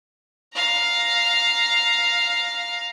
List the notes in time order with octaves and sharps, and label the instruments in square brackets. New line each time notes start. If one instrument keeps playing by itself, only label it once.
[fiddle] F5 A#5